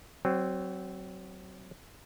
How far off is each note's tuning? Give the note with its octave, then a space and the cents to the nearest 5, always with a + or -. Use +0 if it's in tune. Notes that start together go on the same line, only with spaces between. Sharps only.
F#3 +25 C4 +0